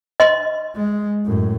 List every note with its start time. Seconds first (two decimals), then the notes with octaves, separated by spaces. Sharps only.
0.20 D#5 C6
0.76 G#3
1.25 F#2 A2